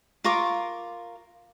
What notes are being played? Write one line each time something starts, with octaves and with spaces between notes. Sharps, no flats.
F4 A#4 C#6 D6